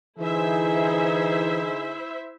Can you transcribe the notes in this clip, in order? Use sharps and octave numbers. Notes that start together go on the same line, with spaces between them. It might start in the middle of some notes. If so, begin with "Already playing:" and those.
D3 E3 D#4 E4 G#4 C5 E5